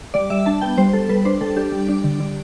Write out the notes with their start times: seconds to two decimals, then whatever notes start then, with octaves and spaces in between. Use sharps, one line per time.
0.14 G3 D5
0.30 G3 E5
0.46 D4 A5
0.61 B3 G5
0.78 G3 C5
0.93 G3 A4
1.09 G3 B4
1.25 D4 C5
1.41 G3 A4
1.56 D4 G4
1.72 G3
1.88 D4
2.04 D3
2.20 D3